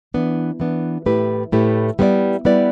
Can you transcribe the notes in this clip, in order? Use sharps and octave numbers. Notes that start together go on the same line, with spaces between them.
E3 B3 D4
E3 B3 D4
A2 A3 E4 G4 B4
A2 A3 E4 G4 B4
G3 B3 E4 B4 D5
G3 B3 E4 B4 D5